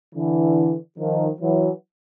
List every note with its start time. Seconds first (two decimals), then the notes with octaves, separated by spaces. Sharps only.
0.15 D3 E3
0.99 D#3 F3
1.41 E3 F#3